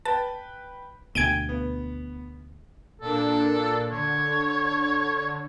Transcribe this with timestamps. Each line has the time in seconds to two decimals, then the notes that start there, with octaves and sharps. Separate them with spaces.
0.05 B4 G5 A5
1.15 D2 B2 G5 G#5 G#6 D7 D#7 G7
1.49 B3
3.01 A#2 D4 A4
3.91 D3 C#5